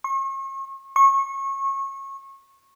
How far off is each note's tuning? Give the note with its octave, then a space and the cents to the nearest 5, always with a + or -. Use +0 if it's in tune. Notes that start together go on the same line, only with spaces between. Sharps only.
C#6 -40
C#6 -25